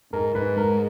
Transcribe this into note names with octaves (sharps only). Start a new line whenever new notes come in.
G#2 A#4
G#2 B4
G#3 A#4